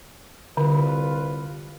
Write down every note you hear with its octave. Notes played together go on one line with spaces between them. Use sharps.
C2 D3 F4 B4